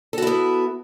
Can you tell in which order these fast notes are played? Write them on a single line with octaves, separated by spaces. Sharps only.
A4 F#4 E4 B3